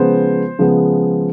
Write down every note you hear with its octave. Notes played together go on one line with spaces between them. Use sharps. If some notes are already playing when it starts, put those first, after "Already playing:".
Already playing: C#3 F3 G#3 B3 C5
C#3 F3 G#3 B3